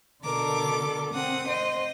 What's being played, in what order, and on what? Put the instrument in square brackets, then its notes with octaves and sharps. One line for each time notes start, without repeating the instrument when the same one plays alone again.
[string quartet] B2 A#4 D6 [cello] D3 A4
[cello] C4 [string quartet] F#5 D#6
[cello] C5 [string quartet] D#5